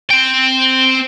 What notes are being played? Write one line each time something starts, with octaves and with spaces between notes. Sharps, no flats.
C4 G5